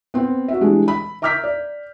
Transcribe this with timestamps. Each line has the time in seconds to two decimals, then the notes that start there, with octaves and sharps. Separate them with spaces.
0.14 B3 C4
0.48 F#4 E5
0.61 E3 G3 G#3 D4
0.88 B5
1.22 E5 A#5 D6 F6 G6 B6
1.44 D5